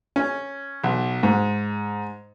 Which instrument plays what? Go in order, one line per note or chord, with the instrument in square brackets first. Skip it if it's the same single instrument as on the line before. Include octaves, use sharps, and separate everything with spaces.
[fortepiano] C#4
B1
G#2